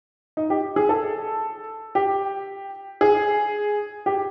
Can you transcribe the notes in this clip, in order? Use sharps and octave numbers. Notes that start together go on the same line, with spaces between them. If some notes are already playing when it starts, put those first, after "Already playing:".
D#4
G4
G#4
A4
G4
G#4
G4